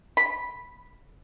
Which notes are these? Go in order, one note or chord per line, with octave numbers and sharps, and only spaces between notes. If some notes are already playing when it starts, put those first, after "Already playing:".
B5